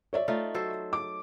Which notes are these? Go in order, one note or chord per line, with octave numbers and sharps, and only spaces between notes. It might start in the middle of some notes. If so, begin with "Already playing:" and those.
C#5 D5 E5
A3 D#4 F4
F#3 A4 C5
D6